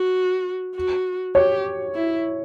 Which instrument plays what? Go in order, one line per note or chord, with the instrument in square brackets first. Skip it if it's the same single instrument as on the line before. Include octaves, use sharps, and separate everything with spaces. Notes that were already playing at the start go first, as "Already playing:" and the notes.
Already playing: [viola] F#4
F#4
[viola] G4 [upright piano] C#5
[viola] E4